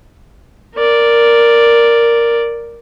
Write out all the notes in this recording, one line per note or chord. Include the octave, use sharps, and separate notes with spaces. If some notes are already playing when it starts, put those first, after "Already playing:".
A#4 D5